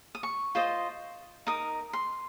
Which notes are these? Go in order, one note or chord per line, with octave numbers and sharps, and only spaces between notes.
D#6
C#6
F4 C5 D#5
D#4 A#4 D#6
C6